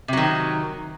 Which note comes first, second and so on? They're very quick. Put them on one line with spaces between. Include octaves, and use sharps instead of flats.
C3 F#3 D#3